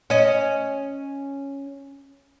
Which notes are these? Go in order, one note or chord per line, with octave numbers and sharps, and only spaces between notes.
C#4 D#5